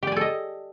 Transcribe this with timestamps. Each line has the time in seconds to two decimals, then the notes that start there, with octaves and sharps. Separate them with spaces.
0.03 G4
0.07 D5
0.12 G#5
0.16 A4
0.21 D#5